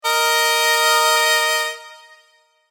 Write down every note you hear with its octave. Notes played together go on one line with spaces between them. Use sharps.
A#4 D#5